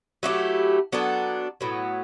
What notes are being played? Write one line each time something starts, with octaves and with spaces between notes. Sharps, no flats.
F#3 A3 E4 G4
F#3 B3 D4 A4
A2 F#3 B3